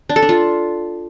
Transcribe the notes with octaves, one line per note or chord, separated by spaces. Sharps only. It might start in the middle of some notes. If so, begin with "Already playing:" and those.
D4
A4
D4
F4